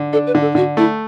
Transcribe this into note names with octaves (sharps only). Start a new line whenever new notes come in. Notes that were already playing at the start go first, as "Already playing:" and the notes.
Already playing: D3
D4 A4
B4
D3
A4
D3 F#4
A3 E4